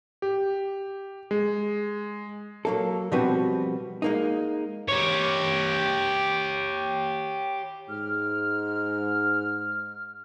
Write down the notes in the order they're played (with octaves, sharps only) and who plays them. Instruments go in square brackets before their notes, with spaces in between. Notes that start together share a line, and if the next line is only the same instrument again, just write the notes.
[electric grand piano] G4
G#3
[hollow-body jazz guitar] F#3 A#3 A4
B2 F3 G3 C4 F#4 B4
G#3 A#3 D#4
[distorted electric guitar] G4 C#5
[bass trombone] G#2 [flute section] F6